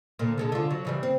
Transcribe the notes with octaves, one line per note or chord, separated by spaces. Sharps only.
A#2 D3
D3 G#3 A4
D3 F4
F#3
C#3 E3 G3
C4